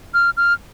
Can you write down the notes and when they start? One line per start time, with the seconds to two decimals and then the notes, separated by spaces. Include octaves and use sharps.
0.14 F6
0.37 F6